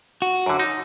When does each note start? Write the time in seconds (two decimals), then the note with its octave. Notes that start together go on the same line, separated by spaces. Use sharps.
0.22 F#4
0.46 F#2 D3
0.59 D#4